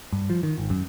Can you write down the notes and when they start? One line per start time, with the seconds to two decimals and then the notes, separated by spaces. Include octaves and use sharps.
0.12 G2
0.30 F3
0.43 D#3
0.58 G#1
0.70 F#2